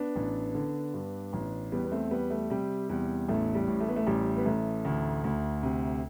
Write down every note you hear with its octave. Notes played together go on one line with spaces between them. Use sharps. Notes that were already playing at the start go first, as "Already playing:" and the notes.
Already playing: B3 D4
A1
D3
G2
A1
E2 G3 B3
B3
A3 C4
G3 B3
A3
C3 G3
E2 G3
A1 A3
G3
A2
A3
B3
A3
A1 G3
B3
A1 A3
D2
D2
C3